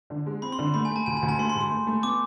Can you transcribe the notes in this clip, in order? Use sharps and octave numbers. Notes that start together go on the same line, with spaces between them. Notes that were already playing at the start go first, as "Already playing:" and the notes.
D3
G#3
C4 B5
C6
D3
A3 B5
G#5
A3
A5
D2 G#5
G#5
D2
A5
A3 C6
C6
G#2
C6
A3
A3
B3 D6